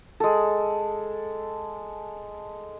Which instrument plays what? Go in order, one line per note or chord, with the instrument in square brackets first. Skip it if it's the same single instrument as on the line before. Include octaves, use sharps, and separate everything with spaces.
[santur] G#3 A4